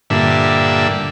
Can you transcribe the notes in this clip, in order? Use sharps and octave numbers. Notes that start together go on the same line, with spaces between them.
G2 A#2 D3 E5